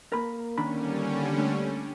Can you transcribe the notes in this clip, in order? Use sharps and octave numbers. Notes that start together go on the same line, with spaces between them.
A#3 A#4 B5
D3 D#3 G3 C#4 D4 B5
A3 D4